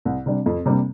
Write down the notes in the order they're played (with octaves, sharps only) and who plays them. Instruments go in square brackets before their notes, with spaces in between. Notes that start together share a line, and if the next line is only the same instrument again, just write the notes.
[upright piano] C2
C3 G3 D4
F2
C3 G3 A#3 D4